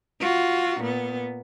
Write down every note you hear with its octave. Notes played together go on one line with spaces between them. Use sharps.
F4 F#4
A#2 B3